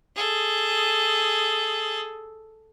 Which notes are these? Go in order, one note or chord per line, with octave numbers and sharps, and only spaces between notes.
G#4 A4